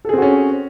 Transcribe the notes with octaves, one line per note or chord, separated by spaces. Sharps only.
C4 C#4 F#4 G#4 A4